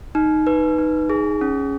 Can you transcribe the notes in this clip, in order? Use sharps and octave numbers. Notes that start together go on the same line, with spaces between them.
D#4
B4
D#4
G#4
C#4